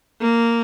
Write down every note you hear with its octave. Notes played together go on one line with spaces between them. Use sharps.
A#3